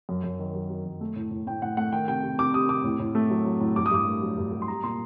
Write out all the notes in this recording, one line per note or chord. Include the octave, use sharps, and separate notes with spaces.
F#2
F#2
D#3
F#3
F#3
F#2
A3
A2
A2
A2 G5
A2 F#5
A3 F#5
D#3 G5
C3 G5
C3
C3 D6
G3 D#6
C3 D6
A2
A2
A3
F#3
F#3
A2
G2 D6
D#6
G2 D6
A3
F#3
G2
G2
C6
G3 A#5
A#2 C6